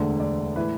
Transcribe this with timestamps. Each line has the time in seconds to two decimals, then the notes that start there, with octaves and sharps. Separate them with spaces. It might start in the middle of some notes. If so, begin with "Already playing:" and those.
Already playing: E1 D2 D3 D5
0.20 D5
0.56 A2 E3 B4